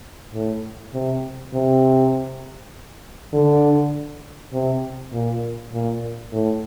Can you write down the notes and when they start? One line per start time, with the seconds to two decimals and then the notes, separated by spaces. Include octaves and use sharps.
0.34 A2
0.94 C3
1.53 C3
3.33 D3
4.53 C3
5.12 A#2
5.72 A#2
6.33 A2